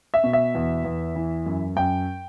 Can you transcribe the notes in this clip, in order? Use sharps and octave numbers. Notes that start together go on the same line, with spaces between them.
E5
B2
E5
E2
E2
E3
F#2
F#2 G5